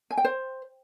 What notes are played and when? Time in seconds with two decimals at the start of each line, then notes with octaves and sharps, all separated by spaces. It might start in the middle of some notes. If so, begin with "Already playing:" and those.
0.11 G#5
0.17 G5
0.24 C5